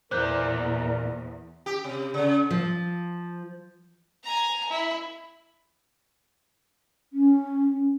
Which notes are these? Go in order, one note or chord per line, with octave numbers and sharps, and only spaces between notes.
E2 A#2 A#4 C5 F#6 G6
G4
C3
C#3
F3
G#5 A#5
E4
C#4